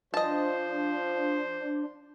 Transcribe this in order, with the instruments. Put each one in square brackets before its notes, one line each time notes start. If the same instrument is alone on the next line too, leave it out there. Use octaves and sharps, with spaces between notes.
[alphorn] F3 [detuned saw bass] D4 [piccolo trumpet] C5 [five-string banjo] D#5 A5